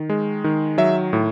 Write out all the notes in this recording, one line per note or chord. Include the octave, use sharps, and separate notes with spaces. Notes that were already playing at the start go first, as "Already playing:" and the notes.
Already playing: D#3
G#3
D#3
F#3 E5
A2